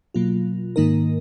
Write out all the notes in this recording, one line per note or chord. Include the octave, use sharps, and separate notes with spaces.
B2 F#3 A#3 F4
G#2 D#3 A#3 D#4 A#4